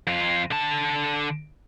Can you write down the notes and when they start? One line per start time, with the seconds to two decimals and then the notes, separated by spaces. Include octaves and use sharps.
0.07 F2 F4
0.51 D3 A5